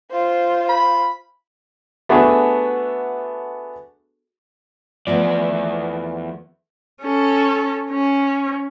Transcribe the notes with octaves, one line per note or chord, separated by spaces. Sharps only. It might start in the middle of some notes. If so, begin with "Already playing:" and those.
F4 C5
B5
A3 B3 D4 F#4 G#4 A4
E2 F3 A3 B3 D5
C#4 A4
C#4